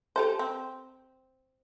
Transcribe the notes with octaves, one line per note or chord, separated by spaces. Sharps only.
G4 A4 C5
C4